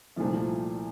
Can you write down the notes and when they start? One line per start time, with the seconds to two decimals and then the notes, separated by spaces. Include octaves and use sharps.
0.16 C2 A#2 F3 A3